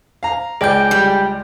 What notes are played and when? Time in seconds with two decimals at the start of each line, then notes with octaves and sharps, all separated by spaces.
0.23 F5 A#5
0.61 C#2 G#4 D5 G5 G6
0.91 G3